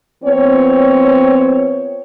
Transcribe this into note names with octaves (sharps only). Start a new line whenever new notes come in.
F3 B3 C4 C#5